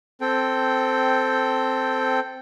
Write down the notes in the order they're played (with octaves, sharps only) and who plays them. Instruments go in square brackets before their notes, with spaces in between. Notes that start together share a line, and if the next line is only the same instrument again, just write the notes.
[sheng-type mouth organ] C4 A4 G5